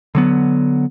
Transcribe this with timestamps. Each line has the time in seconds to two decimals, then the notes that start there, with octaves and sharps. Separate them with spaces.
0.15 D3 F#3 B3